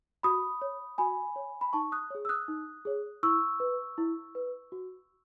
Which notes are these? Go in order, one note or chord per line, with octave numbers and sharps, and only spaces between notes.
F#4 B5 D#6
C#5
F#4 G#5 B5
C#5
B5
D#4 A5 C#6
D#6 F#6
G#4 C#5
E6
D#6 F#6
D#4
G#4 C#5
E4 C#6 E6
B4
E4
B4
F#4